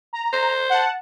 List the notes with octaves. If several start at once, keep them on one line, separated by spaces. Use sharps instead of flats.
A#5
C5
F#5 A5